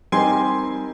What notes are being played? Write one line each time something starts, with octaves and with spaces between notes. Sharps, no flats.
G3 C4 D#4 G4 A#4 G#5 C6